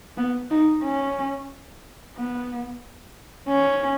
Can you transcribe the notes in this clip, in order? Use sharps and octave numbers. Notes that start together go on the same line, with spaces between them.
B3
D#4
C#4
B3
C#4